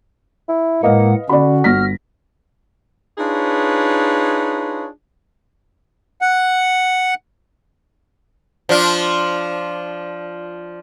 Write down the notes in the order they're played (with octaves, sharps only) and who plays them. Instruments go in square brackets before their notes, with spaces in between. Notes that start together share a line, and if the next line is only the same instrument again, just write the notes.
[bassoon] E4
[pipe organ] A2 G#3 F#5 [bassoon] A#3 [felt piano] B4 D#5 F5
[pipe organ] D3 C#4 [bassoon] F#4 [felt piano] D5 B5
[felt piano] G1 A#6 B6 [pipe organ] F6
[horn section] D4 D#4 F4 G#4 B4 C#5
[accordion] F#5
[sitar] F3 D4 F4